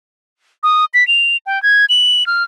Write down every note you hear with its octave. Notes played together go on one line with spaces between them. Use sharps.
D#6
B6
F7
G5
G#6
F#7
F6